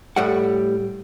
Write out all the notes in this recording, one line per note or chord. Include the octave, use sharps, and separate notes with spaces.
A2 G3 F#5